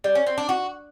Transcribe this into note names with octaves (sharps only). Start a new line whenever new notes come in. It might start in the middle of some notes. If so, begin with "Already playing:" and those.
G3
C#4
C4
D4
F#4